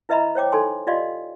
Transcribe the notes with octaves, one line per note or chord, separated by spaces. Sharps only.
E4 B4 D#5 E5 A#5 B5
C5 C#5 G5 D6
D#4 A4 G#5 C6
F4 G4 D5 D#5 F5 C6